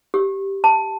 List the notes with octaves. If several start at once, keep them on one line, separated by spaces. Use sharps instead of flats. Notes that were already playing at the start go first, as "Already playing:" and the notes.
G4
A5